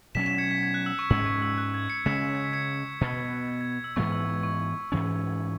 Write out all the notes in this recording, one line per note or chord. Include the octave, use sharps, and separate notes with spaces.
B2 F#3 C#4 B6 E7
B6 E7
G#6 C#7
B6
G#6
F#6
E6
C#6
G#2 G#3 C#4 E6
C#6
E6
F#6
G#6
G#6 C#7
C#3 G#3 C#4 B6 E7
G#6
B6
G#6 C#7
B2 B3
G#6
G#6
G#6
E6
G#2 E3 G#3 B3 C#6
E6
C#6
G#2 E3 C#4